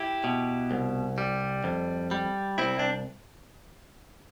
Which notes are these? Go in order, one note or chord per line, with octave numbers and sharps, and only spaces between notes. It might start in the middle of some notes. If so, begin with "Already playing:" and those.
Already playing: E4 G4
B2
C2
G3
F2
G3
C2 C4 E4
D4